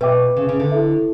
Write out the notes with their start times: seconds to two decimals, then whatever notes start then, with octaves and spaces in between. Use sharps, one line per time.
0.01 B2 B4 E5 G5 D6
0.37 C#3
0.49 C#3
0.60 D3
0.72 E4 A4 E5